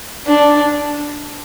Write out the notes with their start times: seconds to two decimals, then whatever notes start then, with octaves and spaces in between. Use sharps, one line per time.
0.27 D4